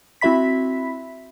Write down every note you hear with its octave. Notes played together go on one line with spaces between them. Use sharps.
C4 E4 F#4 E5 B5 B6